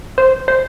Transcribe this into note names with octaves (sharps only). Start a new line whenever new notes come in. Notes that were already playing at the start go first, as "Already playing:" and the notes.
C5
C5